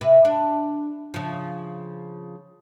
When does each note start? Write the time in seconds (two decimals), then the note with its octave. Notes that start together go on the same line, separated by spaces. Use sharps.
0.01 C3 B4
0.25 D4
1.14 C#3 F3